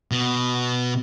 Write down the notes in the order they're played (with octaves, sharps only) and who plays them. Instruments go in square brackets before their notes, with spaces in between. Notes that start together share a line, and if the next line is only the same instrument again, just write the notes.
[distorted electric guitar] B2